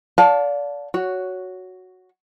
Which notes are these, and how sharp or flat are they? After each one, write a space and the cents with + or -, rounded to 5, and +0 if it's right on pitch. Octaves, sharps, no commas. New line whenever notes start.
D5 -30 F5 +30 A5 +0
F#4 +0 C#5 +10